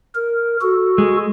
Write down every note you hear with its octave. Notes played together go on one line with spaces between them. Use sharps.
A#4
F#4 A4
G#3